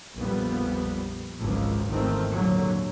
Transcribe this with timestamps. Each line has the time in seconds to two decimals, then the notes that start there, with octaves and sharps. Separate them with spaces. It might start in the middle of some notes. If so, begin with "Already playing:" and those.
0.18 A#1 F2 G3 B3
1.41 G#1 C#2 F#2 F3
1.88 G#1 E2 D#3 F3 A3 C4
2.31 D#2 A#2 D3 F#3